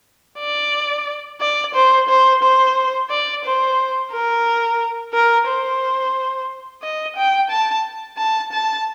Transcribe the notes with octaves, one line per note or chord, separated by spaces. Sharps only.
D5
D5
C5
C5
C5
D5
C5
A#4
A#4
C5
D#5
G5
A5
A5
A5